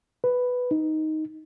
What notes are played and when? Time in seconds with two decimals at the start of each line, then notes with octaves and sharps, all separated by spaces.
0.24 B4
0.71 D#4